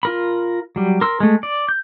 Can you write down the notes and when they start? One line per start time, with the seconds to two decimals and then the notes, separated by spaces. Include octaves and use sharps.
0.03 F4 A#4 B5
0.76 F#3 G3
1.01 A#4 C6 E6
1.20 G#3 A3
1.43 D5
1.69 G6